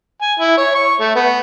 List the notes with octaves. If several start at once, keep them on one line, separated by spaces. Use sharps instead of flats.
G#5
E4
C#5
C#6
A3
B3